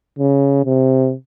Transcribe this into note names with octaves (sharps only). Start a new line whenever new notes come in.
C#3
C3